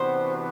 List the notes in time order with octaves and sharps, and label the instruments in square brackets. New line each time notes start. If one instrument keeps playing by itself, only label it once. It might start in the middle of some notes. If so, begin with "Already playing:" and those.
Already playing: [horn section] C3 E3 B3 D4 F#4 [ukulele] C5